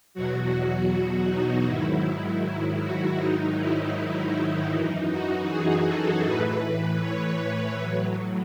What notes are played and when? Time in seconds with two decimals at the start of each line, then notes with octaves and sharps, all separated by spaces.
0.14 E2 B2 F#3 F#4
1.29 D#4
1.67 G#2 D#3 F#3 E4
2.82 F#4
3.19 G#2 D#3 F#3 D#4
3.58 E4
4.72 F#2 E3 D#4
5.10 F#4
5.48 G#4
5.86 A4
6.25 A2 E3 B4
6.63 B4
7.01 C#5
7.39 B4
7.77 A2 F#3